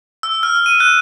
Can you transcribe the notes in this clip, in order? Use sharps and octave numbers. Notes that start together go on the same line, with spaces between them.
E6
F6
D#7
F#6